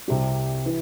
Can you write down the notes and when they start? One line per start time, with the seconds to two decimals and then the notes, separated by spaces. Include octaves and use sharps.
0.08 C2 C3 G3 G4
0.66 E3